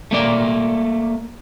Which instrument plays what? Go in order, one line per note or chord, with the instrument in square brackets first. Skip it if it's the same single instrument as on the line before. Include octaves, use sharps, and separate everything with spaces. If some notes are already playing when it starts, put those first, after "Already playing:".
[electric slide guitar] A3 A#3 D5